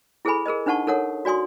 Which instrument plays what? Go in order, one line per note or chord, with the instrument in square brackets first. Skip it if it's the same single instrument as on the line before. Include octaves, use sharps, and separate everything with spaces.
[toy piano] E4 G#4 A4 C5 G#5 B5
G#4 A#4 C5 D#5
D4 D#4 C5 F#5 A5 C#6
D#4 A4 A#4 C#5 F#5 D#6
F#4 D5 G#5 C6 D#6